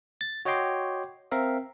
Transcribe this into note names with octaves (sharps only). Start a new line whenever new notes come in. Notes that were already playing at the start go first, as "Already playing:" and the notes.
A6
F#4 C#5 D#5 G5 C6 D6
C4 A#4 E5 F5